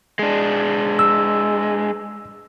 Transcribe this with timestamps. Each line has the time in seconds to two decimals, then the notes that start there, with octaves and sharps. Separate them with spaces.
0.19 G#3 D4
0.99 E6